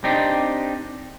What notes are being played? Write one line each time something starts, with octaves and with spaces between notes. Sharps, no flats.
C4 D4 D#4 G4